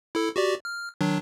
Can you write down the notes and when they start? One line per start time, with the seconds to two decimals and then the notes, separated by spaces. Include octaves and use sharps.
0.15 E4 A4
0.36 F#4 G4 D5
0.65 F6
1.01 D#3 F#3 D4